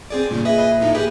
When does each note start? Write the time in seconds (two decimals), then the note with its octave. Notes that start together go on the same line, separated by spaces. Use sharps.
0.10 C4 G#4 D5
0.31 G2 A#2 C#3
0.45 G#4 B4 D#5 E5
0.80 A#1 A2 D#4
0.95 G4 G#4 B4